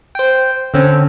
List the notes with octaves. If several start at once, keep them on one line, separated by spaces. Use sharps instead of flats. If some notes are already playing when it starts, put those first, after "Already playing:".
C5 G5
D3 C4 C#4